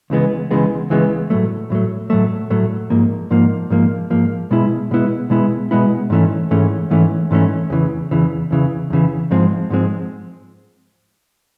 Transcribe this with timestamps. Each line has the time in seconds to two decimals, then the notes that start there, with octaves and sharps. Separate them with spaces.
0.10 C#2 C#3 E3 G#3 B3
0.51 C#2 C#3 E3 G#3 B3
0.90 C#2 C#3 E3 G#3 B3
1.30 A2 F#3 A3
1.70 A2 F#3 A3
2.10 A2 F#3 A3
2.50 A2 F#3 A3
2.90 G#2 F3 A#3
3.31 G#2 F3 A#3
3.70 G#2 F3 A#3
4.10 G#2 F3 A#3
4.51 B2 G#3 B3 E4
4.91 B2 G#3 B3 E4
5.30 B2 G#3 B3 E4
5.71 B2 G#3 B3 E4
6.10 G#2 E3 A3 C#4
6.51 G#2 E3 A3 C#4
6.90 G#2 E3 A3 C#4
7.31 G#2 E3 A3 C#4
7.70 E2 C#3 E3
8.11 E2 C#3 E3
8.51 E2 C#3 E3
8.90 E2 C#3 E3
9.31 G#2 F3 G#3 C4
9.70 G#2 F3 G#3 C4